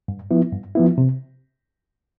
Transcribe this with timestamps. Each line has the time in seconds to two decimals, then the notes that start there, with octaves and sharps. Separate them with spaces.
0.08 G2
0.31 F3 B3 E4
0.52 G2
0.75 F3 B3 E4
0.98 C3